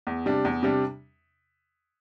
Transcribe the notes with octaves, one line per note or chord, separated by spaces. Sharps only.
E2
C3 G3 D4
E2
C3 G3 D4